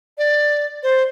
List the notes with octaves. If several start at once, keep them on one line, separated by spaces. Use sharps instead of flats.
D5
C5